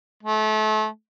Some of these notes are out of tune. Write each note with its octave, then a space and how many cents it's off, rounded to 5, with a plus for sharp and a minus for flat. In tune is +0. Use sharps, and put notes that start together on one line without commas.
A3 -30